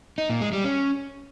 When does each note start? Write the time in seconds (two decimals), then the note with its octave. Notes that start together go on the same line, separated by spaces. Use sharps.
0.18 D#4
0.30 A#2
0.41 G#3
0.53 G3
0.64 C#4